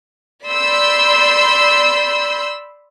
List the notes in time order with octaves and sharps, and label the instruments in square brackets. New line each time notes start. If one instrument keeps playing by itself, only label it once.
[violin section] D5 B5 C6 E6 G6